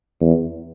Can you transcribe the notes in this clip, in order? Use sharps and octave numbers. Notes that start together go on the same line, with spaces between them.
E2